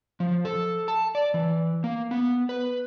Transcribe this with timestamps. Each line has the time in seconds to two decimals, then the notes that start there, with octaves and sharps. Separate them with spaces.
0.20 F3
0.45 A4
0.88 A5
1.15 D5
1.34 E3
1.84 A#3
2.11 B3
2.49 B4